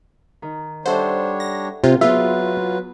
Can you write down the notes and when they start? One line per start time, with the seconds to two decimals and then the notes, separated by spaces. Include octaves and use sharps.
0.42 D#3
0.86 G3 D4 A4 C5 C#5 E5 F#5
1.40 A#6
1.84 C3 F4
2.01 F#3 B3 F4 G#4 B4 E5